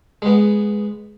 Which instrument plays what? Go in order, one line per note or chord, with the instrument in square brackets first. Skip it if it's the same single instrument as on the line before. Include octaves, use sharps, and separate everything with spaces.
[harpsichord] G#3 B3